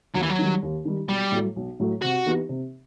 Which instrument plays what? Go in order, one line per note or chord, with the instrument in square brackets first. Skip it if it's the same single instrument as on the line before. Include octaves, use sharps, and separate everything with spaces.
[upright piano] D#2 [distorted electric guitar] F#3
[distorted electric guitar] E3
F#3
[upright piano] D#3 G3
D#2
D#3 G3
[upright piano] B1 [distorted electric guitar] G3
[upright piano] A2 F#3 A3
B1
A2 F#3 A3
[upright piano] C3 [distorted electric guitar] F#4
[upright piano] E3 B3 D#4 G4
C3